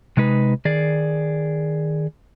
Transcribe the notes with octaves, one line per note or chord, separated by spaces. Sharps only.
C3 G#3 D#4 B4
D#3 G#4 D5